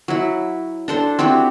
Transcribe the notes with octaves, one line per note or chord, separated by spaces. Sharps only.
F#3 E4
D4 A4 C5
C4 E4 F#4 G4